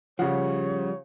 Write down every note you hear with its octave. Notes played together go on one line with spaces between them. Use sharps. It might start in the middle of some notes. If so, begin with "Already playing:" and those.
C#3 F3 G3 C#5 F#5